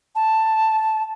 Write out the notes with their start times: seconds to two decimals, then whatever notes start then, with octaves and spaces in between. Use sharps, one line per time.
0.16 A5